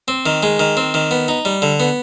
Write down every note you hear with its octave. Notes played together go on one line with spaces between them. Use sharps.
C4
D#3
G#3
D#3
C4
D#3
B3
D#4
G3
D3
B3